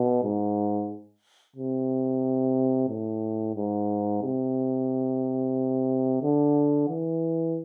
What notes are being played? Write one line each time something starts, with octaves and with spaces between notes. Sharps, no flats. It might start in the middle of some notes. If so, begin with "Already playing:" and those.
Already playing: B2
G#2
C3
A2
G#2
C3
D3
E3